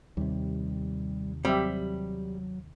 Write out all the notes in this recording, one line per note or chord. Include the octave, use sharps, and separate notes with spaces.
D#2 C3 G3
F#3 G3 C4 G4 E5